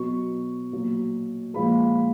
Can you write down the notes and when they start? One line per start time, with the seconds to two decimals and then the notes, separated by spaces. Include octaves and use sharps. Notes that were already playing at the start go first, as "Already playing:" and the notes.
Already playing: B2 F#3 C#6
0.72 A#2 F#3
1.54 A#2 F3 G#3 B5